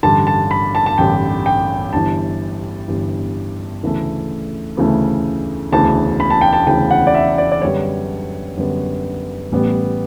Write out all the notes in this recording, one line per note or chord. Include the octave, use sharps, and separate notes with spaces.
A1 G2 D3 A5
A5
B5
A5
A5
A1 G2 D3 G5
G5
G1 G2 E3 A5
G1 G2 E3
D2 C#3 E3 A3
D2 C#3 E3 A3
E1 D2 C#3 E3 A5
B5
A5
G5
A5
E1 D2 C#3 E3 G5
F#5
D5
E5
D5
D5
F#2 D3 G3 B3 C#5
F#2 D3 G3 B3
A1 A2 G3 B3